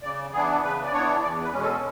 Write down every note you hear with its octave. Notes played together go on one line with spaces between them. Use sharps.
C#3 D5
E3 B3 D4 G#4
C#3 B4
D5
E3 B3 D4 C#5
E2 D5
B4
B2 G#3 C#4
A4